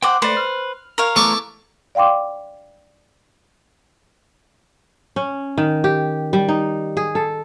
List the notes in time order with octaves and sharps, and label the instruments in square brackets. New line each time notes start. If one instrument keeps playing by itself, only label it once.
[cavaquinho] C5 F#5 [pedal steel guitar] G5 D6 F#6
[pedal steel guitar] A3 D5 [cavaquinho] B4 C5
[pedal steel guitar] F6
[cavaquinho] A#4 C#5 F5
[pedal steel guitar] E3 A3 B3 [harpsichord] A4 C#6 D6
[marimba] D5 F5 G5 C6 D6
[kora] C#4
D#3
G4
G3
D#4
G#4
A4